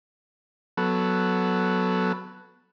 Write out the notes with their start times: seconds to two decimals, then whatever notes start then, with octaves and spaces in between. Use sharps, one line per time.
0.77 F#3 B3 A4